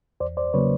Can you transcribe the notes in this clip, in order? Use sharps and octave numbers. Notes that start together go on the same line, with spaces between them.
E2 C5 D5
C5 D5
C#3 F#3 A#3 B4 C#5